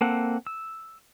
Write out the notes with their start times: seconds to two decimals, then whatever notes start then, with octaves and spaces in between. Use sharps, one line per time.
0.01 A#3 C4 A4 F#5
0.47 E6